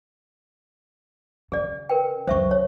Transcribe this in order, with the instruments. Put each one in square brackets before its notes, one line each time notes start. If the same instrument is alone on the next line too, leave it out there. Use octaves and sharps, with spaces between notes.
[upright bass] C#3 [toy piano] G#4 D5
[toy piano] A#4 B4 G5
[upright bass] C#2 F#2 [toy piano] C5 E5 C#6
[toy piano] C#5